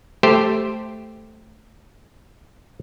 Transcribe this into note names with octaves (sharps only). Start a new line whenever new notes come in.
A3 G4 C5